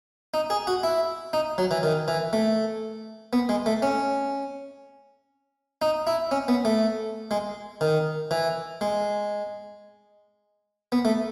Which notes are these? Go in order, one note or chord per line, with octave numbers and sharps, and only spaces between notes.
D#4
G#4
F#4
E4
D#4
F#3
E3
D#3
E3
A3
B3
G#3
A3
C#4
D#4
E4
C#4
B3
A3
G#3
D#3
E3
G#3
B3
A3